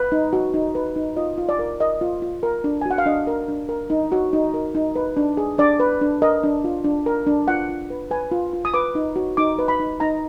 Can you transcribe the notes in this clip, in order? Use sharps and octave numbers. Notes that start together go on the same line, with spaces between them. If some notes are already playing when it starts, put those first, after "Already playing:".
Already playing: B4
D#4
F#4
D#4
B4
D#4
F4 D#5
F4
D5
A#4
A#4 D#5
F4
F4
A#4
D4
G#5
F#4
F#5
F5
D4 D#5
A#4
D4
A#4
D#4
F#4
D#4
A#4
D#4
B4
D4
G#4
D4 D5
B4
D4
A#4 D#5
D4
F4
D4
A#4
D4
F4 F#5
F4
B4
B4 G#5
F4
F4
D#6
B4 D6
D#4
F#4
D#4 D6
B4
B5
D#4
D#4 A#5